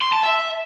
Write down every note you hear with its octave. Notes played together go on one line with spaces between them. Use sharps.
C6
A5
E5